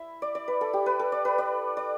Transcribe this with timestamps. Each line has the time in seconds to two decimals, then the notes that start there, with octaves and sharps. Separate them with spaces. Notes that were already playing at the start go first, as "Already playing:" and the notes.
Already playing: E4 E5
0.22 D5
0.35 D5
0.48 B4
0.61 A4
0.73 G4
0.86 B4
0.99 A4
1.12 D5
1.25 B4
1.38 D5
1.77 D5